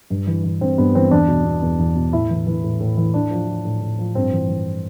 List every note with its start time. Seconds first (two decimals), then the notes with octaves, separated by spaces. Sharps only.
0.10 G2
0.27 E3
0.44 E3
0.61 G2 C4
0.78 G2 B3
0.95 E3 C4
1.11 E2 D4
1.28 B2
1.45 B2
1.62 E2
1.79 E2
1.96 B2
2.13 A2 E4
2.30 E3
2.47 E3
2.64 A2
2.80 A2
2.97 E3
3.14 A2 D4
3.31 F3
3.48 F3
3.65 A2
3.81 A2
3.99 F3
4.15 G2 C4
4.32 E3
4.48 E3